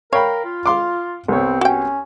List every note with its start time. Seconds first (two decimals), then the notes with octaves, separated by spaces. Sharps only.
0.13 A#4 C#5 F5 G5 B5
0.45 F4
0.66 F5 C6 D6
1.28 C2 B3 C4 C#5
1.61 C#4 F#4 G5